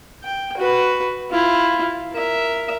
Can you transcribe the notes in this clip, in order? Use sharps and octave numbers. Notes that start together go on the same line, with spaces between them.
G5
F#4 B4
E4 F4
A#4 E5